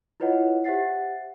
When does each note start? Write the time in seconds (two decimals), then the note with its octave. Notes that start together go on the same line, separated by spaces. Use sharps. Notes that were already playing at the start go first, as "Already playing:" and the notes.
0.20 E4 F4 B4 C#5 D#5 F#5
0.64 G4 C5 E5 F#5 A6 C7